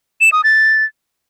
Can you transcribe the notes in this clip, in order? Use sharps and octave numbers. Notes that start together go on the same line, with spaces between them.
E7
D#6
A6